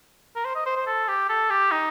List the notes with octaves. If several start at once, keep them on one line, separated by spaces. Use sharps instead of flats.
A#4
C5
D#5
C5
C5
A4
G4
A4
G4
D#4